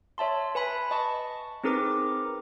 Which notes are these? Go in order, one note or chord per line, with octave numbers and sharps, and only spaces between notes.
C#5 E5 A5 C6
B4 G#5 B5
D#5 A5 C#6
C4 D#4 G#4 A#4 B4 D6